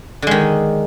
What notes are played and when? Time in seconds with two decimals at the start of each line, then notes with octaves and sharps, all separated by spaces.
0.22 D3
0.27 G#3
0.31 D#3